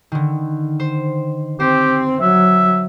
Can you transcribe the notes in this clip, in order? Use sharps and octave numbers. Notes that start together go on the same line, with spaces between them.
D3 D#3
C5
C4 G4 C5
F#3 E5